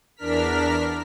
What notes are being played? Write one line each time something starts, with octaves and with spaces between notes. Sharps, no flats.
E2 D4 A#4 F6 B6